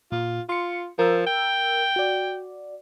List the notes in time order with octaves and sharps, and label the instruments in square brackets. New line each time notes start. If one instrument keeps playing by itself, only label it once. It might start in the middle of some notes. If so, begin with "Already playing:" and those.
[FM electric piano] A#2 [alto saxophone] F4
[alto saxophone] F4 [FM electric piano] C6 C#7
[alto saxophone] F3 [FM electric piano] A#4 E6
[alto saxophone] G5
[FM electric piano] F#4 D5